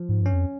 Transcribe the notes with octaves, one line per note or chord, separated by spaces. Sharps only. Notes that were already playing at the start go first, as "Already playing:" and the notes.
Already playing: F3
G#2
G2 C#4
F2